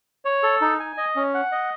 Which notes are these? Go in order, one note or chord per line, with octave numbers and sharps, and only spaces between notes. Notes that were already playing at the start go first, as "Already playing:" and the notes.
C#5
A4
D#4
G#5
D#5
C#4
F#5
D#5